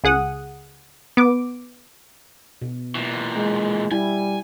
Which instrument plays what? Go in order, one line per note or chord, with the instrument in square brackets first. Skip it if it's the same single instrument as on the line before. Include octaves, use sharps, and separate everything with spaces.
[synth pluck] C#2 G#4 F#5 D#6
B3 D6
[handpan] B2
[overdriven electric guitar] A#2 E3
[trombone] G#3
[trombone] G3 [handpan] E4 [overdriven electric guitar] G#5